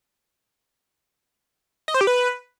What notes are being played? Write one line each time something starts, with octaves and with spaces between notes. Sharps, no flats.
D#5
C5
G4
B4